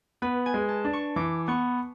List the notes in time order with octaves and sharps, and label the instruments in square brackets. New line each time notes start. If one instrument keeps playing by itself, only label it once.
[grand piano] B3 [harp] B4
[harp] G#5
[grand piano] G#3
[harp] A5
[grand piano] D4
[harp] C#6
[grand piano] E3 [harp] D6
[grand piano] B3 [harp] C#6